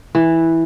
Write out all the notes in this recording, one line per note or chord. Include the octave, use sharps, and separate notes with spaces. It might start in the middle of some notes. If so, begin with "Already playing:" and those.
E3